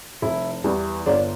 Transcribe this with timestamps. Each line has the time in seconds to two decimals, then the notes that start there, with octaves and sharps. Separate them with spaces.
0.22 F1 E4
0.64 E2 E3 G3
1.06 G1 D4